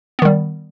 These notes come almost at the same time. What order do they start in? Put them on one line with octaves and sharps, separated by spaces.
B3 D#3 G3